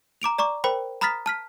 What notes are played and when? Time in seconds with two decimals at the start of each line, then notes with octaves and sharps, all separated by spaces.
0.22 A#5 D6 D7 F7
0.38 D5 A#5 C#6 D6
0.64 A#4 C5 G5 B5
1.01 A#5 B5 D#6 F6 A6 B6
1.26 A5 F6 B6